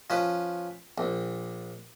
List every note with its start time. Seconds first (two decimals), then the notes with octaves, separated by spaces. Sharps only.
0.10 F3 C#4 B4
0.98 A#1